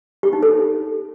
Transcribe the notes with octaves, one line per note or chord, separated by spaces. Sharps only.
G4
D#4
A4